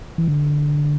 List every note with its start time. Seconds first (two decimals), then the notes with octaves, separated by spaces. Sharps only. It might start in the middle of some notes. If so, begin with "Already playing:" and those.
0.18 E3
0.28 D3